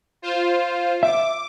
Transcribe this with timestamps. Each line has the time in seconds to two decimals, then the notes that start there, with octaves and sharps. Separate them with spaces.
0.22 F4 C5
1.03 E5 D6